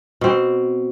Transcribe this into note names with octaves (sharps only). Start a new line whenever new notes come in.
B2 C4